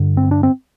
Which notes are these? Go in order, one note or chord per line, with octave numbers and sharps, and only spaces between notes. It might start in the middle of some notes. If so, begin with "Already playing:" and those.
Already playing: G2 D3
C4
D4
C4